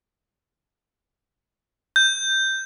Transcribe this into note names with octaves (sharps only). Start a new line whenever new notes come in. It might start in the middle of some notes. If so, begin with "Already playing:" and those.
G6